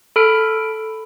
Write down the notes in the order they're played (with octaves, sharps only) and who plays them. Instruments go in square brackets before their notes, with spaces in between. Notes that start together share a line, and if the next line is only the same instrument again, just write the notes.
[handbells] A4 B5 F6 D7